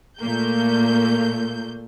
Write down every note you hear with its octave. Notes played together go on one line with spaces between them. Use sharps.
A#2 A3 A#3 G6